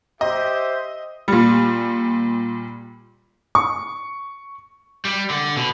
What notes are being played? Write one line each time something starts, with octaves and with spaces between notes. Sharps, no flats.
G4 C5 D#5 E5
A#2 G3
C#6
G3
D3
B2